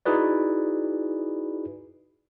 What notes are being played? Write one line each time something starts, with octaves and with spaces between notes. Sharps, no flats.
D#4 E4 F#4 G#4 B4 D5